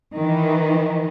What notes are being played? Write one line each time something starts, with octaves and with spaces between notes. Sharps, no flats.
D#3 E3